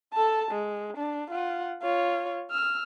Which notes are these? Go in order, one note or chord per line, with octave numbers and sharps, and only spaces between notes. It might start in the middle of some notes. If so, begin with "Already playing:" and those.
A4 A5
G#3
D4
F4 F#5
F4 C#5
E6 F6